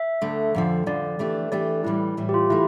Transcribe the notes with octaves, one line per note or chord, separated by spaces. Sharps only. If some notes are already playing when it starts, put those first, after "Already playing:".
Already playing: E5
D2 D3 A3
F2 D3 F3
F2 D3 F3 D5
E3 A3 D4 G4
E3 A3 D4 G4 D5
A2 E3 G3 E4
A2 E3 G3
G4
F4
E3 A3 E4